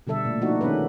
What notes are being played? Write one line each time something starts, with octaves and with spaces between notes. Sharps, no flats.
B2 D3 G3 A4 E5
A#2 A3
F3 D4 D#4 F#4
D#3 G#3 B3 C#4 B4